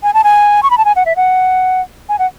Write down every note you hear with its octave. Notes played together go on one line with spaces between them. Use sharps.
G#5
A5
G#5
C#6
B5
A5
G#5
F#5
E5
F#5
G#5
F#5